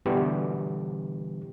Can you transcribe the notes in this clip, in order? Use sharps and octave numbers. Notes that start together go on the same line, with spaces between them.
B2 D3 E3 G3 B3 G4